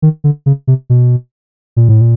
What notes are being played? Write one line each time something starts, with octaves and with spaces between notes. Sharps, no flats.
D#3
D3
C#3
C3
B2
A#2
A2
A#2